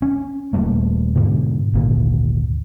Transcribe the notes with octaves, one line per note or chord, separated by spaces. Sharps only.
C#4
D#1 G3 A3 A#3
G#2 B2 D3
G#1 D2 A#2